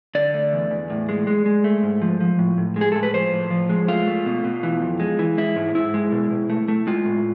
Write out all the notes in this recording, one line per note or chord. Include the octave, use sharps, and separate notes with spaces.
D3 D5
A3
E2
E2
A2
G#3
G#3
G#3
A3
G#2
F3
F3
A2
A2
G#3
G#4
A2 A4
B4
F3 C5
A2
F3
G#3
A3 F4
A3
B2
B2
E3
F2
G#3
E3
G#3 E4
G#2
G#2 E4
G#3
B2
B2
A3
A3
G#3 F4
A2